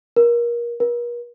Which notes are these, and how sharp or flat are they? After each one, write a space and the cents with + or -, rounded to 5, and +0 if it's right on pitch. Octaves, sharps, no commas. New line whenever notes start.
A#4 +25
A#4 +45